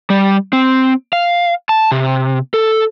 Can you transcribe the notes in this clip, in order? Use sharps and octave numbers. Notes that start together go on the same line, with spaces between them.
G3
C4
F5
A5
C3
A4